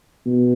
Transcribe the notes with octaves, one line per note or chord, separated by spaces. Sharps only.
B2